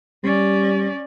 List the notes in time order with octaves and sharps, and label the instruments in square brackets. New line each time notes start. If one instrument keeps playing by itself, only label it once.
[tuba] G3 [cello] C#4 D5